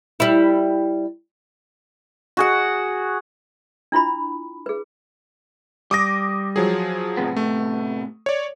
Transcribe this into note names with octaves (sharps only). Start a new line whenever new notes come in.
G3 E4
F#4 G#4 F#5
D4 E4 F4 B5
G#4 B4
G3 D6 D#6 A#6
F3 F#3 G#4
A2 C3 B3
A3
C#5 D5